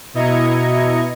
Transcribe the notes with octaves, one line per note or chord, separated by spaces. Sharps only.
B2 E4 D#5 A#5 G#6 C#7